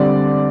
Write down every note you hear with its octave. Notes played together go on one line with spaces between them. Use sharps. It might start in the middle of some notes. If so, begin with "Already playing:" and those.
Already playing: D3 G3 C4 D5